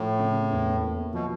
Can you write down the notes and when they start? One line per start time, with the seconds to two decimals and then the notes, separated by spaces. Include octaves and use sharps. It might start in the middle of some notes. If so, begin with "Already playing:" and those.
Already playing: A2 F3
0.19 C#3
0.51 E2
0.82 A#3
1.14 B2 F3